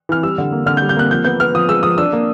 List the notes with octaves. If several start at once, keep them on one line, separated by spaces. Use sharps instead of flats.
E3 F6
G3 E6
D3
A#3
D3 F6
G6
G3
G6
A#3 F#6
F3 G6
B3 G6
B3 F6
F3 D#6
G#3 E6
F3 D#6
D4 E6
A#3